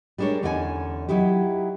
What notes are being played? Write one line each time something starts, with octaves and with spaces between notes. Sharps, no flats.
G3 G#3 D4 A#4 C#5
E2 D3 C#4 D#4 G5 G#5
F#3 D#4 E4 G4